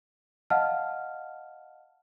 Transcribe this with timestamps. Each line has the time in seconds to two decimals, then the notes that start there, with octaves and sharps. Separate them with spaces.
0.50 D#5 F5 F#5 A5 F6